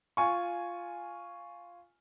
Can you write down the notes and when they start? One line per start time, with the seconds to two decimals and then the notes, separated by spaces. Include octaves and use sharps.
0.17 F4 G#5 C#6